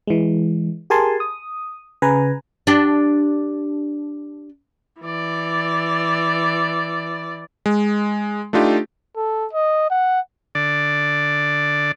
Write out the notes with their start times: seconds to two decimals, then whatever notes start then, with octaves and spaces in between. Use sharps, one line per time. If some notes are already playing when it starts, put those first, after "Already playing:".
0.07 E3 G#3
0.90 G4 G#4 A#4 G#5 A5 C6
1.20 D#6
2.02 C#3 B4 G#5 A#5
2.67 D4 G4
5.01 E3 D5
7.66 G#3
8.53 A3 D4 D#4 F4 G4
9.16 A4
9.53 D#5
9.90 F#5
10.55 D3 D5